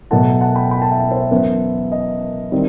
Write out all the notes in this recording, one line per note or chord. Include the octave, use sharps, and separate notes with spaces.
B2 F#3 A3 E4 F#5 A5
F#5 A5
G5 B5
G5 B5
A5
E5 G5
C5 E5
F#2 E3 B3 E4 C5
D#5
D#3 G3 C4